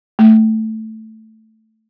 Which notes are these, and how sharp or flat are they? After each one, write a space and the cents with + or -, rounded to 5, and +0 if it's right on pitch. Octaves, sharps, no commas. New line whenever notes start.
A3 +0